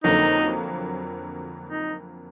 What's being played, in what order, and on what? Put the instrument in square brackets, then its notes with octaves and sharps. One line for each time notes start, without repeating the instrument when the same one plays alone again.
[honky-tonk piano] F2 D3 F#3 A#3 [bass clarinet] D#4
[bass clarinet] D#4